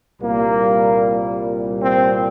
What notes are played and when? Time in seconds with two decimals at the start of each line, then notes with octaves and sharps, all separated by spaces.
0.20 C2 A#2 G3 A#3
1.80 C4